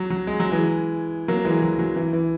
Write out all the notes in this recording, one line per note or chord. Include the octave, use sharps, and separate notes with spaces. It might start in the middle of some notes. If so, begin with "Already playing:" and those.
Already playing: F#3
F#3
G#3
F#3
E3 G#3
F#3 A#3
E3 G#3
F#3
F#3
E3
E3